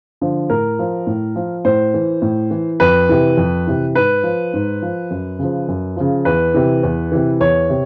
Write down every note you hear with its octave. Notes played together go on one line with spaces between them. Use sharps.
D3 F3
A2 A#4
F3
A2
F3
A2 C5
E3
A2
E3
F2 B4
C3 E3
F2
C3 E3
G#2 B4
F3
G#2
F3
F#2
C#3 F3
F#2
C#3 F3
E2 B4
C3 E3
E2
C3 E3
E2 C#5
C3